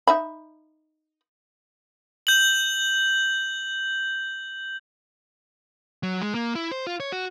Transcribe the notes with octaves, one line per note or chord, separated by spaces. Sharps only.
D#4 E5 B5
G6 F#7
F#3
G#3
A#3
E4
C5
F4
C#5
F#4